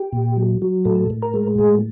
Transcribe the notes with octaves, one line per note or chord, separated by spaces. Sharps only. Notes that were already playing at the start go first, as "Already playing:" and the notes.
Already playing: G4
A#2
F#3
F#3
A2 A4
A2
A#4
G#3
A2 G#4